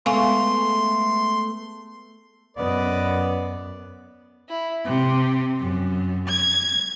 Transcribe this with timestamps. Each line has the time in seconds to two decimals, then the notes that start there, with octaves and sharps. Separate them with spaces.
0.06 G#3 A3 B3 A4 F5 G#5 C6 C#6
2.57 F#2 B3 B4 D5 D#5
4.50 E4
4.85 C3
5.58 F#2
6.27 G#6